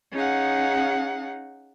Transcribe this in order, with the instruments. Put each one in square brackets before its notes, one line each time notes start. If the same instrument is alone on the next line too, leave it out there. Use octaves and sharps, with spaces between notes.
[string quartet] C#4 D#4 G#4 F5 F#5